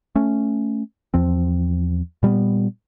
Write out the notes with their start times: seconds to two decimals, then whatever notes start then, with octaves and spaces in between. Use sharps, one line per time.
0.15 A3 C#4
1.14 E2 F3 C4
2.23 A#2 G3 G#3 B3